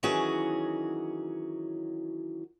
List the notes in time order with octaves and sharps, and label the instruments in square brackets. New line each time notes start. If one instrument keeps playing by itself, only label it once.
[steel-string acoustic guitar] D#3 E3 F#3 C#4 F#4 G#4